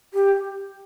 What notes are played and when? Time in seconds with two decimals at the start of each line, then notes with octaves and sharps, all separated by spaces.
0.13 G4